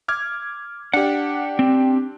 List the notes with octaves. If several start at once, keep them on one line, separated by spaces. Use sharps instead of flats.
D6 F6 G#6
D4 G4 F#5
C4